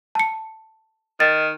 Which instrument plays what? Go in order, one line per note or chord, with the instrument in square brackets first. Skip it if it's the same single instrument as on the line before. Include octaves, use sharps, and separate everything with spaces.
[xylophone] A5 C#7
[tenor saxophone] D#3 [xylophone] A6